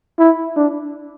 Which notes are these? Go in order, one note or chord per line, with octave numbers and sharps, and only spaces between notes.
E4
D4